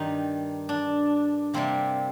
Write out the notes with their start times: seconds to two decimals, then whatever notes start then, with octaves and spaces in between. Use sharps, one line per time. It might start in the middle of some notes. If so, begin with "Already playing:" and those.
Already playing: G2 D#3 G3 D#4
0.69 D4
1.54 C3 G3 A#3 C4